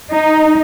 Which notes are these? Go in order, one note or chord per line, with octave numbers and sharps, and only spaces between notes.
D#4